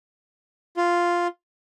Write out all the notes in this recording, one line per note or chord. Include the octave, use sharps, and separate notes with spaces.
F4